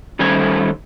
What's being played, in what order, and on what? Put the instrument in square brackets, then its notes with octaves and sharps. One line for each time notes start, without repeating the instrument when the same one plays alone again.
[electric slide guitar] D#3 G3 A3 C#4 C5 G#5